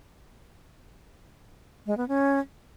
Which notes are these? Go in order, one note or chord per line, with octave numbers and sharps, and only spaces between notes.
G#3
B3
C#4